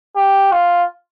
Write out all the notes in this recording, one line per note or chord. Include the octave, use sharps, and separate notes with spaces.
G4
F4